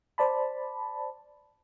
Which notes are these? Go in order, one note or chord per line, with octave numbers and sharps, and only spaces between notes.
C5 D5 A5 B5